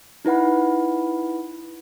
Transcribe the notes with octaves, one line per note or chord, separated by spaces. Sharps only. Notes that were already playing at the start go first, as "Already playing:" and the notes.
D#4 E4 B4 F#5 B5